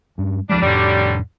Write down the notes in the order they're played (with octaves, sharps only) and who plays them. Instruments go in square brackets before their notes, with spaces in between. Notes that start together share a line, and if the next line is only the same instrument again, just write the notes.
[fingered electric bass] G2 G3 C#4
[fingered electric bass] C#2 F3 G#3 [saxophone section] G3 D4
[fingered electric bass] F2 A2 [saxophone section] D3 F#3 G3